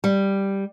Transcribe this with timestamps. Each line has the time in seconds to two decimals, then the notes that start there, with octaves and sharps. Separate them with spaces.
0.04 G3